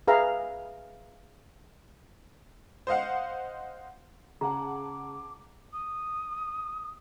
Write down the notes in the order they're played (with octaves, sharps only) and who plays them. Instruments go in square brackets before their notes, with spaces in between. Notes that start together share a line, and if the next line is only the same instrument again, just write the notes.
[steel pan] G#4 B4 E5 F5 A#5
[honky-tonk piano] C5 D#5 F5 F#5
[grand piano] C#3 [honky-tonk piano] G#4 F#5 A5 [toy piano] A#5 [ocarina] D6
[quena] D#6